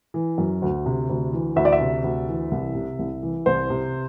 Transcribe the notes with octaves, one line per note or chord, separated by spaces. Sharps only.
E3
F#2
D2
C3
D2
E3
D2 E5
D5
E5
C3
D2
E3
C2
C3
C2
E3
C2 C5
C3